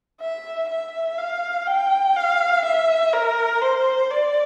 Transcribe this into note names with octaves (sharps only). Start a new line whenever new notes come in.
E5
E5
F5
G5
F5
E5
A#4
C5
D5